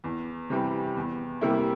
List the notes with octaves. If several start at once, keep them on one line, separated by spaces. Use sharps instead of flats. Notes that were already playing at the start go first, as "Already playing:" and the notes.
E2
C3 E3 G3
E2
C3 G3 A#3 E4